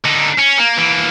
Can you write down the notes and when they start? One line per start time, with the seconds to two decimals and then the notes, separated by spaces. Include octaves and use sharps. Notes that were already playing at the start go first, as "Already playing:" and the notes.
0.04 D3 D#4
0.38 C#4
0.58 A#3
0.77 E3 A#3